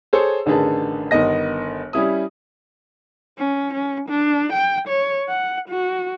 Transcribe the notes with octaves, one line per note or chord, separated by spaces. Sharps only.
G#4 A4 C5 C#5
A1 D3 D#3 G#4 B4 A5
G1 D#3 B3 D#5 A#6
G3 C#4 E4 D#6
C#4
C#4
D4
G5
C#5
F#5
F#4